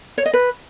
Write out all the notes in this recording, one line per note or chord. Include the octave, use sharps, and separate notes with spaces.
C#5
D#5
B4